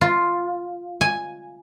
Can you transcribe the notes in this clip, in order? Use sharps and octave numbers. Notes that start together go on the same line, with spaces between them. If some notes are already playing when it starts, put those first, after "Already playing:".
F4
G#5